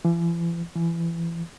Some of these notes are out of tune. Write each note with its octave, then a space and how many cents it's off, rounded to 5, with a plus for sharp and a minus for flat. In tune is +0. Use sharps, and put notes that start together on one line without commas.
E3 +45
E3 +30